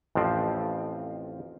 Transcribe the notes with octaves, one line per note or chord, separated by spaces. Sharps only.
A1 F2 F3 C4